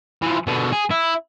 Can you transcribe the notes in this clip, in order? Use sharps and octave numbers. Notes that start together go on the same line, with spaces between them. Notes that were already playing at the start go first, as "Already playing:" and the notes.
E3 F3
B2 D3
G#4
E4